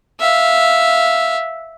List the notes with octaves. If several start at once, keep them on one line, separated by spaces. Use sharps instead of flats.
E5 F5